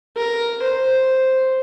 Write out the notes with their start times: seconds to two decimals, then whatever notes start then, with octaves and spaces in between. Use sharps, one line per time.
0.17 A#4
0.62 C5